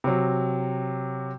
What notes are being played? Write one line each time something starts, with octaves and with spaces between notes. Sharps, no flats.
C3 F#3